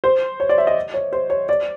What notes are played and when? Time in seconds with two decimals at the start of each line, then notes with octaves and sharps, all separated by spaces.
0.04 C5
0.40 C#5
0.49 D5
0.58 E5
0.67 D#5
0.94 C#5
1.13 C5
1.30 C#5
1.49 D5